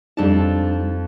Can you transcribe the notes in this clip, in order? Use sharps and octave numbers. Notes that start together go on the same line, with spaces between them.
F2 G3 D4 D#4 A5